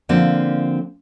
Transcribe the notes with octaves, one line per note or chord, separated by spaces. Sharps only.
D3 F3 A#3 C4 D5